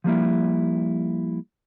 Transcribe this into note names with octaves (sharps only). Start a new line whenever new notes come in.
F3 G3 A#3 E4